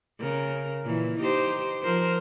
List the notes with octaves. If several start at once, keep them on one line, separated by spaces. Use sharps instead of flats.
C#3 A#4
A#2 E3
D#4 G4 C5
F3 A#4 C5